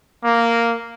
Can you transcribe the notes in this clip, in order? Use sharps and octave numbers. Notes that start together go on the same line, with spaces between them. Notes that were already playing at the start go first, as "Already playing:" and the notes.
A#3